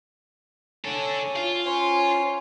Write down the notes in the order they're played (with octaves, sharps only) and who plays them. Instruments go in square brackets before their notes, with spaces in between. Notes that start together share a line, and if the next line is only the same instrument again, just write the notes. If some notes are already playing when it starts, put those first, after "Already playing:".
[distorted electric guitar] D4 A4 [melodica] C#5 G#5
[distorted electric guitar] F4
[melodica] C#4 C5 C#5